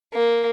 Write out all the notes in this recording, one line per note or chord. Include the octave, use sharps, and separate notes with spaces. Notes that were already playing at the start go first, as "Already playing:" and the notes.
A#3